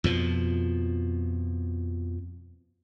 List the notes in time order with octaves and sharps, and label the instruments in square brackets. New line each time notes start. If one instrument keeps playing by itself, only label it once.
[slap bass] F2 B2 F3